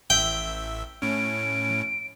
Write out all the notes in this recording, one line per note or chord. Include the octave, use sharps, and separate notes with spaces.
A1 E5 G5
A2 C#4 D7